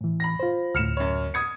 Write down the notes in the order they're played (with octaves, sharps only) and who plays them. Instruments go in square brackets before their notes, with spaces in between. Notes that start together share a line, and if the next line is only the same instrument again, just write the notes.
[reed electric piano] A2 E3
[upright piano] B5 A#6
[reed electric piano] F4 C5
[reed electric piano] D2 A2 [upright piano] F6 C#7 E7
[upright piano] F#2 C#5
D#6 G#6 C#7